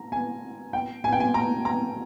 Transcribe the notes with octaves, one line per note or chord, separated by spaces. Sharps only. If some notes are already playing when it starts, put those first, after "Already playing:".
Already playing: A#5
G#5
G5
G#5
G5
G#5
A#5
A#5